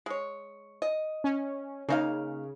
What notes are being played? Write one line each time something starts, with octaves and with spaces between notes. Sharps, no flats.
G#3 C#5
D#5
C#4
C#3 A#3 D#4 F5